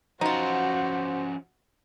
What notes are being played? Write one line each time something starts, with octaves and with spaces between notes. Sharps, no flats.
F3 C#4 D#4 F4 F#4 C5 F#5